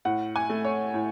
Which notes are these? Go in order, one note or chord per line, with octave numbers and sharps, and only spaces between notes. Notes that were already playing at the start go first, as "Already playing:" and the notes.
A2 F#5
G#5
A3
C#5
A2